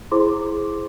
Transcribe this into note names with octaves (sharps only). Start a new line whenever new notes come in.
E4 G#4 C5 C6 D6